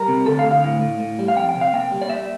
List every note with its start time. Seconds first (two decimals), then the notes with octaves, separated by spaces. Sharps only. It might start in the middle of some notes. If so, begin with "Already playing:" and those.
Already playing: G3 A#4
0.08 C3
0.26 D2 A4
0.39 F5
0.45 D2
0.51 F5
0.64 A2
0.81 A2
1.00 A2
1.19 G3
1.28 F5
1.36 F2 G5
1.49 G5
1.56 C3
1.61 F5
1.73 A#3 G5
1.92 G3
2.02 D5
2.10 A#3 E5